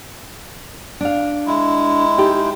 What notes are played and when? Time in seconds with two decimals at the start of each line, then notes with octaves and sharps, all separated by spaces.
1.01 D4 F5
1.46 G#3 E4
2.18 D#4 G4 A4